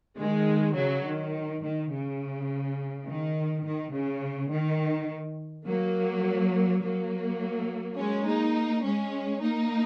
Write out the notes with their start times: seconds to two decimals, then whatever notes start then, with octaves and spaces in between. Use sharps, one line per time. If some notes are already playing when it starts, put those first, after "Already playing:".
0.17 D#3 G#3
0.74 C#3 F#3
1.04 D#3
1.62 D#3
1.91 C#3
3.06 D#3
3.64 D#3
3.93 C#3
4.51 D#3
5.66 F#3 A#3
6.82 F#3 A#3
7.97 G#3 C#4
8.26 A#3 D#4
8.84 G#3 C#4
9.42 A#3 D#4